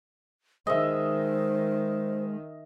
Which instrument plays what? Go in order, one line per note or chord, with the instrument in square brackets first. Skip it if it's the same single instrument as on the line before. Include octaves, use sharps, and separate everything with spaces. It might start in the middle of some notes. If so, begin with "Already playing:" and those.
[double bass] D#3 [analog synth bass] G#3 [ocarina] C5 [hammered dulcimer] D#5 E5